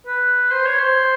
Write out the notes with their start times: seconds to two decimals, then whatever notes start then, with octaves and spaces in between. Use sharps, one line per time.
0.06 B4
0.51 C5
0.66 C#5
0.79 C5